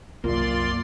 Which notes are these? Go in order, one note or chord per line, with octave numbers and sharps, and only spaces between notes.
C2 F#2 A#2 A#3 F4 D5 C6